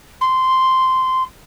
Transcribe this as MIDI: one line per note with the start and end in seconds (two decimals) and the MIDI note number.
0.21 1.23 84